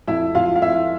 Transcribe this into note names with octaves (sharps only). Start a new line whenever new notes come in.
F2 E4 E5
F2 F4 F5
F5
F2 E4 E5